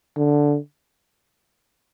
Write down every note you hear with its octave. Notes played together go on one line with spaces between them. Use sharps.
D3